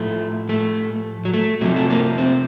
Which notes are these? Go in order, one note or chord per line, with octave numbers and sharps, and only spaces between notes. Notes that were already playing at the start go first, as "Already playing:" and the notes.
Already playing: A2 F3 A3
A3
F#3
A3
C3 F3 F#3
A3
A#3
C4